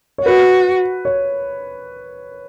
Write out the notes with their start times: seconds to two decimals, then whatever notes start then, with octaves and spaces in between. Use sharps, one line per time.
0.18 C#5
0.25 F#4 B4
1.05 C#5